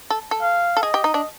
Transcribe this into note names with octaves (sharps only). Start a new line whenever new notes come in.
A4
A4
F5
A4
G#4 D#5
G4
D#4
D4